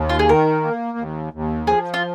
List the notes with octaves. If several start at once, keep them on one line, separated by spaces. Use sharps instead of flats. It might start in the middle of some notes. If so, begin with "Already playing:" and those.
Already playing: D#2
F4
G#4
D#3 A#4
A#3
D#2
D#2
F3 G#4
F4